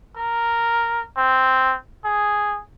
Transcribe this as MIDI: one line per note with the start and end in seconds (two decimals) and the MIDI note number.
0.17 1.05 70
1.17 1.76 60
2.05 2.62 68